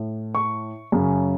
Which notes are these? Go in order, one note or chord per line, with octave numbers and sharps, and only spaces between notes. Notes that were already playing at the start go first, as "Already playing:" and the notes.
Already playing: A2
C#6
F#2 C#3